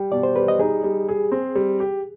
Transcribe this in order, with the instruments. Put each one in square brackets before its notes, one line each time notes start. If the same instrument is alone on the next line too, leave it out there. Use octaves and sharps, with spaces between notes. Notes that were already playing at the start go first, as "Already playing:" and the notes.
Already playing: [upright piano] G3 [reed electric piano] G5
[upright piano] B2 [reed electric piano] D5
[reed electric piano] C5
[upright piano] G3 [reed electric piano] B4
[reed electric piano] D#5
[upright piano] D#4 [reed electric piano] G#4
[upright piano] G3
G#4
C4
G3
G4